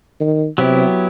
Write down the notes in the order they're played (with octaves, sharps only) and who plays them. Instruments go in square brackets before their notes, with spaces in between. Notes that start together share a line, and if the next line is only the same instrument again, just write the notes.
[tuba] D#3
[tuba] C3 [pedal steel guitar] F#3 B3 E4 G4